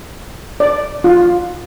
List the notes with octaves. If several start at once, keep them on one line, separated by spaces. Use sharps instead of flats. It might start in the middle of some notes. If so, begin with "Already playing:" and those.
D5
F4